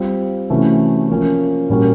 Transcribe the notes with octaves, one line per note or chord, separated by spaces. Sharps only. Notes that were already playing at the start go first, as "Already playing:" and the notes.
Already playing: G3 C4 F4
C3 E3 A3 C#4 F#4
F3 A#3 C#4 F4
A#2 G3 A#3 C#4 F#4